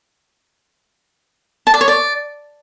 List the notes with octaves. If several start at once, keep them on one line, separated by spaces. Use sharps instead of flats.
A5
D5
C#5
D5